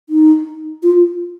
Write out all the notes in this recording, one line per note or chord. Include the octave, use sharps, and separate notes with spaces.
D#4
F4